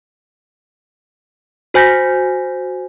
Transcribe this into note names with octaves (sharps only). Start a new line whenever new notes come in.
F#4 C5 G#5 G6 A#6 B6